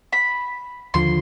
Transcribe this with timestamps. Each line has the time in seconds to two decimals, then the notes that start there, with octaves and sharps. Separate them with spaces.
0.13 B5
0.94 D#2 D3 F3 C6